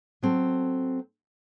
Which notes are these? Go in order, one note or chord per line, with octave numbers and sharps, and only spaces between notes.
F#3 C4 A4